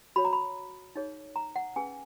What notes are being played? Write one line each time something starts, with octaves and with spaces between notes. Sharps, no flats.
F#4 C#5 B5
A#5
B5
D#4 G#4 C#5
A#5
F#5
C#4 G#4 B4 G#5